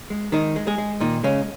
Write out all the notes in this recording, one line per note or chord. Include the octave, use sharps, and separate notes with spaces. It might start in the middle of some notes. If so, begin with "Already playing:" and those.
G#3
D#3 G#3 D#4
G#3
G#3 G#4
G#3
A#2 D#3 D#4
C#3 G#3 C#4